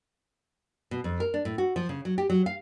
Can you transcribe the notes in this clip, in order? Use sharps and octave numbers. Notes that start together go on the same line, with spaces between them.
B2
F2
A#4
D4
A2
F#4
F3
C#3
F#3
G4
F#3
F5